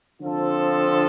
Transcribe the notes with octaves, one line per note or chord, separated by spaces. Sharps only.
D3 F3 C4 F4 A4